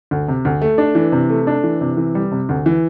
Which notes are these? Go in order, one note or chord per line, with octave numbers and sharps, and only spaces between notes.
D2
C3
D2
A3
D4
E3
C3
A3
D4
E3
C3
E3
G3
C3
D2
E3